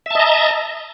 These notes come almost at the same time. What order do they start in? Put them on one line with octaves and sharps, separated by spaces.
E5 A5 D#5 A#5